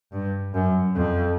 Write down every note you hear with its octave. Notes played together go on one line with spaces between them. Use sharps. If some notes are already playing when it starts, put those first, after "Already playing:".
G2
F#2
F2